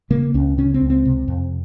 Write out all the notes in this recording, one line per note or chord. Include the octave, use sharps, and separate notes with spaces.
C#3 A#3
C#2 C#4
C#3 C#4
C4
C#2
C4
C3
F2